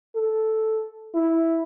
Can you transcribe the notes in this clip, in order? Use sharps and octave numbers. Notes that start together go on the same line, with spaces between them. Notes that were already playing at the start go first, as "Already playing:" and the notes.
A4
E4